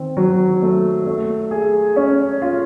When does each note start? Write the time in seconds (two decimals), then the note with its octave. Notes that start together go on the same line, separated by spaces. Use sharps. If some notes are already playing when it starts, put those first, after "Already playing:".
Already playing: D#3 C4
0.17 F#3
0.62 A3
1.07 A3
1.51 G#4
1.96 C#4
2.42 F4